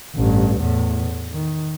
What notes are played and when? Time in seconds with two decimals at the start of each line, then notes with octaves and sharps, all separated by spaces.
0.15 A1 G2
0.60 E2 A2
1.32 D#3